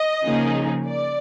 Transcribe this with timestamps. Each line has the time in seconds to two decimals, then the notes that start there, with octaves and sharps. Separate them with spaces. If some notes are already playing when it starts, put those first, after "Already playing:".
Already playing: D#5
0.23 C#3 F3 A#3 D#4 G#4
0.86 D5